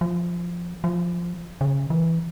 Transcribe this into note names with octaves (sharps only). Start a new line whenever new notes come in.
F3
F3
C#3
E3